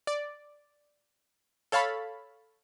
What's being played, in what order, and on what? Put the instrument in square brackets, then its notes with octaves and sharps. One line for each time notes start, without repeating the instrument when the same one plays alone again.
[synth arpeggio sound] D5
A4 C#5 F5 A5 B5